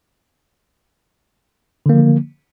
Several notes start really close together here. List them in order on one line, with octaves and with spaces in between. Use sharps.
D3 A#3 F3